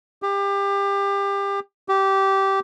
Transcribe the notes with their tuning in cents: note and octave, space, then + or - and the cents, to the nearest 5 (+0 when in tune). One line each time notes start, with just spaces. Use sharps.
G4 +25
G4 -15